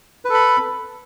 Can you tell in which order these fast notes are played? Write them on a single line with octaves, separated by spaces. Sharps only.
B4 A4 B5